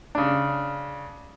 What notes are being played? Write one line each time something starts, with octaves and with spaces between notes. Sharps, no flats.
C#3 D4